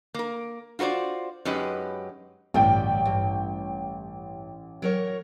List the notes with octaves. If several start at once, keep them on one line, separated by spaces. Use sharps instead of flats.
A#3 A#4
F4 F#4 A#4 C5 D5
F#2 G#3 C#4 D#4 G4 B4
A1 D2 G2 G3 G5
G2
F#3 A#4 C#5